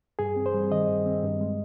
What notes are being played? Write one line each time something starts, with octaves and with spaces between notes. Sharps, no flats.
G2 G#4
C4
C5
G3
D#3 D#5
G2
C4
G2
G#3